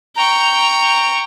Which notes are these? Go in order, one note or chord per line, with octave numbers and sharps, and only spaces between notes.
G5 A#5 C#6